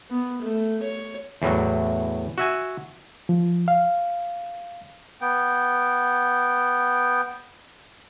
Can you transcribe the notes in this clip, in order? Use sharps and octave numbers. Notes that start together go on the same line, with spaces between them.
B3
A3
C#5
E2 A2 F#3
F#4 E5 G#5
F3
F5
B3 G5